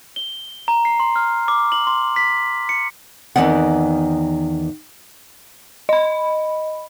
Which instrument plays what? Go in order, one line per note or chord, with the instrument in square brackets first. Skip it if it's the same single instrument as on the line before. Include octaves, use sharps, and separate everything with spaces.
[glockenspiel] G7
A#5
C7
C6
F6
D6
F#7
C6
B6
C#7
[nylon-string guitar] E2 D#3 B3 C4 F#5
[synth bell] D#5 B5